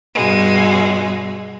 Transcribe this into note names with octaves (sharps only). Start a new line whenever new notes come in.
G2 B2 G#3